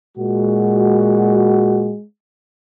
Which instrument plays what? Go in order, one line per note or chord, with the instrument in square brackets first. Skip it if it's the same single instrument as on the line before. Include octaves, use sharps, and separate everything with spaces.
[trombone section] A#2 F#4 [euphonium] G#3